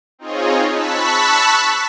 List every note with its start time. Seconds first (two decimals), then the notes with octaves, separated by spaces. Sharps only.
0.19 C4 D#4 F4 G#4 C#5 D#5
0.71 A5 B5 C#6 E6 F#6 B6